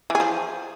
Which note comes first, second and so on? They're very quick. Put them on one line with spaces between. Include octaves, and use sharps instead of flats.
E3 G#4 F3